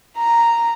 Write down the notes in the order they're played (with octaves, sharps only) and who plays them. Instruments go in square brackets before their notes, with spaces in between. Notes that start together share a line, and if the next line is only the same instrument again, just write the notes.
[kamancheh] A#5